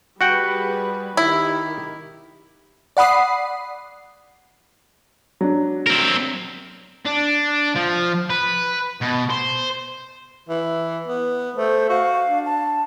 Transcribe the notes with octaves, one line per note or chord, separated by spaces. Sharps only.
G3 F#4 G#4 B4 F#5 G5
D#3 E4 G4
D5 F#5 B5 D#6 C7
F#3 D4
C4 A#4
D4
F3
B4
B2
C5
E3
B3
A3 C5
F#4 F5
D4
A5